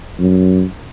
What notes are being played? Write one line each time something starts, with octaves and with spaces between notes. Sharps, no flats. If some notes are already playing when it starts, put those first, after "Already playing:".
F#2